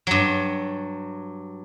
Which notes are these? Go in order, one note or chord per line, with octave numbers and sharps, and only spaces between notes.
G2 F#3